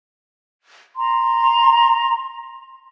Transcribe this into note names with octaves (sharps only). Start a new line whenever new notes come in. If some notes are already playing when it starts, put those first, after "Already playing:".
A#5 C6